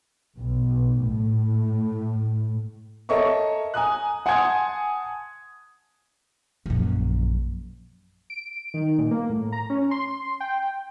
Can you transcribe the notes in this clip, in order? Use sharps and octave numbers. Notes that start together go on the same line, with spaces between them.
B1
A2
A4 A#4 C#5 D#5 E5 C#6
G#5 A#5 D#6 F#6
F#5 G#5 A5 C6 D#6 G#6
A#1 F#2
D7
D#3
A#2
A#3
A2
A#5
C#4
C6
G5